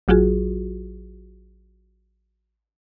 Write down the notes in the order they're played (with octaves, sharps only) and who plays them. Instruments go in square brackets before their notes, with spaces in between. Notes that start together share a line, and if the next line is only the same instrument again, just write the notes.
[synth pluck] A1 F#3 F4 F#4 G#4